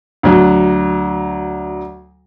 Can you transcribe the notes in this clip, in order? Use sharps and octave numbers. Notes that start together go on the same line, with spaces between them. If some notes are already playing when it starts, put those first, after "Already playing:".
D2 F#3